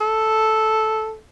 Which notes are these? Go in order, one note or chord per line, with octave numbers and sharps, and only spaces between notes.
A4